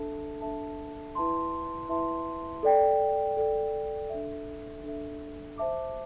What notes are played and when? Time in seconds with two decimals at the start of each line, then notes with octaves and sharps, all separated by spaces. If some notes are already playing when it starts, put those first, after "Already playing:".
Already playing: D4 A4 E5 A5
0.41 D4 A4 E5 A5
1.15 E4 B4 E5 A5 C6
1.89 E4 B4 E5 A5 C6
2.63 A4 D5 G5
3.37 A4 D5 G5
4.10 D4 A4 E5
4.84 D4 A4 E5
5.58 C5 E5 A5 D6